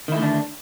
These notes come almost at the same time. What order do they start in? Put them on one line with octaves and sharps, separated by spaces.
D#3 E4 A3 D3 D4